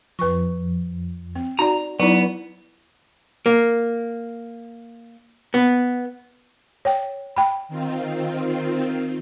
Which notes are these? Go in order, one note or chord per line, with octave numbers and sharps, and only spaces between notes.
F2 F3 B4 C#6
C4
D#4 F#4 D5 A#5
F#3 B3 D#4 E4 D5 C#6
A#3
B3
C#5 G5
G5 B5
D#3 C4 F4